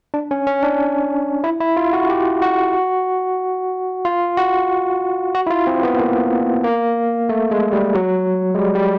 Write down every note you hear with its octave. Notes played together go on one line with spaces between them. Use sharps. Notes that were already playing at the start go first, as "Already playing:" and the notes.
D4
C#4
C#4
D4
E4
E4
F4
F#4
G4
F#4
F4
F#4
F#4
E4
F4
C4
B3
A#3
A#3
A3
G#3
G3
F#3
G#3
G3
G3